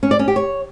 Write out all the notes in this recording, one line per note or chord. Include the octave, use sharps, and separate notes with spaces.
C#4
D5
C#4
G4
C#5